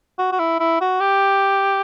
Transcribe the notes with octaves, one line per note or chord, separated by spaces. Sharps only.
F#4
F#4
E4
E4
F#4
G4